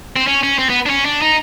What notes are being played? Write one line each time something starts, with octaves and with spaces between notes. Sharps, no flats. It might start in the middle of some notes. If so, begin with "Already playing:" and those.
C4
C#4
C#4
C4
B3
D4
C#4
D4
D#4